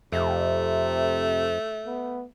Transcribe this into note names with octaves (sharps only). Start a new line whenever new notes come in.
F2 C3 A3
B3